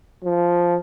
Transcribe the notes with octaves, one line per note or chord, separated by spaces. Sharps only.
F3